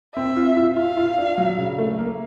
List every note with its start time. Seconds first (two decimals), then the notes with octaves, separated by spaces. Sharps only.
0.16 C4 E5
0.36 F4
0.57 F4
0.77 F4 F5
0.97 F4
1.18 D4
1.38 F#3
1.58 C#3
1.78 A3
1.98 A#3